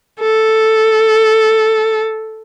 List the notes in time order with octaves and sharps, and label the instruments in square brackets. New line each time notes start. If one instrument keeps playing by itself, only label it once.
[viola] A4